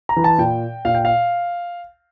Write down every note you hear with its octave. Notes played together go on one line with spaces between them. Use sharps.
A#5
E3
A5
A#2 G5
A#2 F5
G5
F5